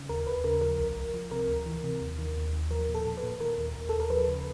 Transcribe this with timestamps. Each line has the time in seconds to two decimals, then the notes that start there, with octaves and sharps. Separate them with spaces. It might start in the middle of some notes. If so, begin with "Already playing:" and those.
Already playing: C#3
0.09 D#2 A#4
0.27 D#2 B4
0.44 C#3 A#4
0.61 F3 A#4
0.79 C2
0.96 C2
1.14 F3
1.31 C3 A#4
1.48 D2
1.66 E3
1.83 C3
2.01 D#2
2.19 D#3
2.36 D#2
2.53 D#3
2.71 F3 A#4
2.88 A#2
2.95 A4
3.06 A#2
3.17 B4
3.23 A#2
3.40 D#3 A#4
3.58 D#2
3.75 D#2
3.89 D#2 A4
4.00 A#4
4.10 F3 B4
4.27 C#3